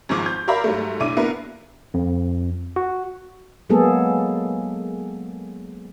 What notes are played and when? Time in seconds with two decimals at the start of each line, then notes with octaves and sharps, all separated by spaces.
0.09 G#1 G#2 F3 D6
0.26 G6
0.48 A#4 D5 E5 F5 A#5 B5
0.64 G#2 F#3 G3 A3
1.00 B1 D4 E4 D6 D#7
1.17 A#3 B3 D4 E4 A#4 B4
1.94 F2
2.76 F#4
3.70 F#3 G#3 A#3 B3 G#4 A4